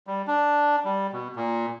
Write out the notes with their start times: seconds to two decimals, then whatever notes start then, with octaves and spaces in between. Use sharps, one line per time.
0.07 G3
0.28 D4
0.85 G3
1.13 B2
1.36 A#2